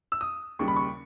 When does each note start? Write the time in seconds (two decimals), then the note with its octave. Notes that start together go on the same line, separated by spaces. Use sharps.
0.12 E6
0.21 D#6
0.59 D#2 C#3 G3 C#6
0.68 B5
0.76 C#6